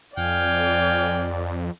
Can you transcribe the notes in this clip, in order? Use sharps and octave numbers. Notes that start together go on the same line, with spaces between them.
F2 D5 F5 G5 G#5